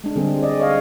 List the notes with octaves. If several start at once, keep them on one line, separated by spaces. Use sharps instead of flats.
G#3 D4
D3 G3 C4 D4 G#4
D5 D#5
C#5 D#5 F5